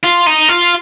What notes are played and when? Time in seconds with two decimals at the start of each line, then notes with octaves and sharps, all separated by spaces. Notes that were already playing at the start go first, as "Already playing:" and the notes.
0.03 F4
0.26 D#4
0.49 F4